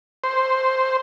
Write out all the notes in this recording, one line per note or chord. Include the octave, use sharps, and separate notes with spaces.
C5